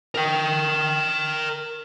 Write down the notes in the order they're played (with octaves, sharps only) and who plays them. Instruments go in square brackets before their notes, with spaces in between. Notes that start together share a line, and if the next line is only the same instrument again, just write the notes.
[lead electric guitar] A#4 G5